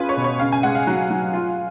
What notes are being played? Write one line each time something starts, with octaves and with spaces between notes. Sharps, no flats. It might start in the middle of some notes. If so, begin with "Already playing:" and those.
Already playing: C#4 F4 G#4 B4
C#5
B2
C#5
C#3 F5
G#5
G#3 F#5
F5
F#3
F#3
F4